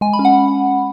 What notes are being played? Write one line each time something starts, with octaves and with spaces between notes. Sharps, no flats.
G#3 G#5
B5
C#4
F#5